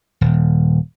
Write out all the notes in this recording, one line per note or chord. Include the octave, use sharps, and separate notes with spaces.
D#1